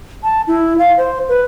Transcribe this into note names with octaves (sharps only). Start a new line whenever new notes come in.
A5
E4
F5
C5
B4